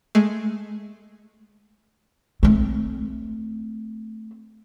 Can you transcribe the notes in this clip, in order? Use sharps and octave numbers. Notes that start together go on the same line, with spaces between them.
G#3 A3
A3 C4